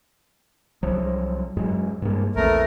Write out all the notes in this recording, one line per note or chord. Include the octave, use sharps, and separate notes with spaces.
C2 F3 F#3
F#2 F#3 G#3
G2 G#3 A#3
A#1 E2 A3 B3 A#4